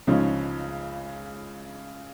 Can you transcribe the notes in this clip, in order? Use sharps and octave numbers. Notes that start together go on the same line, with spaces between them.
C#2 C#3 F3 G#3 C#4